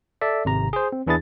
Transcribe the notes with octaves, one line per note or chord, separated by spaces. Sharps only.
A4 D5 E5
G#1 C3 A#5
G#4 C5
C4
E2 E3 D4 E4 G#4 A6